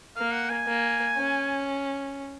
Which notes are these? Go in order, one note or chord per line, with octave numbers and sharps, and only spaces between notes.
A#3 F5
F#5
G#5
A#3
C#4